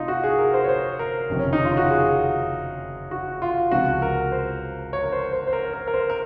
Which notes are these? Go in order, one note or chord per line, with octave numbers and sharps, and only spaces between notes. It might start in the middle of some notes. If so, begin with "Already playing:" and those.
Already playing: F1 F2 D#4 F4
F#4
G#4
A#4
C5
C#5
C5
A#4
F#1 F2 C3 D#3
C#4
D#4
F4
F#4
G#4
F#4
F4
C#2 C3 F3 F#4
A#4
C5
C#5
A#4
C5
C5
C5
A#4
A#4
A#4
C5
A#4